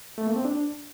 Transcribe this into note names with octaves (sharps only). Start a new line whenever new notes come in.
A3
A#3
C4
D4